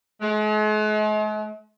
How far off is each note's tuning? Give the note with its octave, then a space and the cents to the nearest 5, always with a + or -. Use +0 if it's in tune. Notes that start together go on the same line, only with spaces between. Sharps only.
G#3 +45